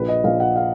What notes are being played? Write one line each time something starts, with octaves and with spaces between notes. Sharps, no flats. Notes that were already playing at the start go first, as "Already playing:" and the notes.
Already playing: A#1 B4
D#5
A#1 F5
F#5
F5